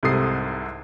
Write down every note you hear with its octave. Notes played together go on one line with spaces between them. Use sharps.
C2 G#2 C3 A4 D#6 C7